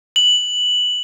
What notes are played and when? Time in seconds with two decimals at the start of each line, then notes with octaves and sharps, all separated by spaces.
0.16 F#7